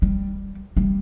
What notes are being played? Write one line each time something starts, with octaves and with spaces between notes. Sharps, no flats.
G3
G3